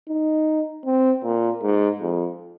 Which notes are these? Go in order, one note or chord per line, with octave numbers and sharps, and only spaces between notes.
D#4
C4
A#2
G#2
F2